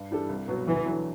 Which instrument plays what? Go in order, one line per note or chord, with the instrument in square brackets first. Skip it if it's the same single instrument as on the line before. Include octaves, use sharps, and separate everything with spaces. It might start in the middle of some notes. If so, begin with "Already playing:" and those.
Already playing: [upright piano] G2
E3 G3 D4 A4
C2
B2 F#3 B3 F#4
[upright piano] D2 [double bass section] E3
[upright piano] D3 F#3